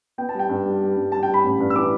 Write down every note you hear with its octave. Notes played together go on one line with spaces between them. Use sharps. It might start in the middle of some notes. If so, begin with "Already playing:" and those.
B3 G5
A5
G3 G5
G2
G3
G3
G2
G3 A5
G5
G3
B5
A1
G2
E6
E3 D6